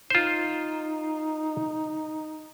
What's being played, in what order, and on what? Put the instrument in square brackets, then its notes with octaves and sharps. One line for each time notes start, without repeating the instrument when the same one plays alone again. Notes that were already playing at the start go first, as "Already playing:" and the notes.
[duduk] D#4 [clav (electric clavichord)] F4 C5